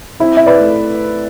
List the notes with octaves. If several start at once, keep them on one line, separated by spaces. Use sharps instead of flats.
C4 E4
E5
B4 D5
A3